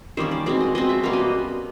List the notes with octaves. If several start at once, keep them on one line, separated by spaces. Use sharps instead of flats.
D#3 G3 A#3 C#4 C5
D5
B2 G#3 C4 D5
D#5
B2 G#3 C4 D#5
E5
B2 G3 A#3 C#4 F5
D#5